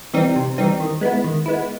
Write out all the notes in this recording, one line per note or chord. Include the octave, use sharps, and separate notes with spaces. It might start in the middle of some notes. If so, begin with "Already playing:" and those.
E3 G3 C4 D#4
C3
E3 G3 C4 D#4
D#3
G#3 B3 E4
D#3
G#3 B3 E4